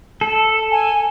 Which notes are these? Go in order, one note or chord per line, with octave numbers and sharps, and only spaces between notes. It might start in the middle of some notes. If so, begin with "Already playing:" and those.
A4
G#5